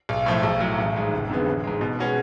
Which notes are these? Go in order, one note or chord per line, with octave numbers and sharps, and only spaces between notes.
B1
A2 F3 A3
B1
A2 F#3
A1
G#2 G#3
F1
F2 D3 G#3 B3
A1
G#2 G#3
B2
G#3 C#4 F#4 B4